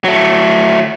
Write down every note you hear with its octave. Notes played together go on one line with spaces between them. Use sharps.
F#3 A3